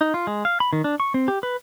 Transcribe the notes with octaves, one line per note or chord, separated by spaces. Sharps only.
D#4
F4
G#3
F5
B5
D#3
D4
C#6
C4
G4
B4